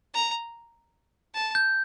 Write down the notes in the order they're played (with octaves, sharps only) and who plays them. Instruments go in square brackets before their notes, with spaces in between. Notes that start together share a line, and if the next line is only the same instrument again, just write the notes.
[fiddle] A#5
A5
[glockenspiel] G6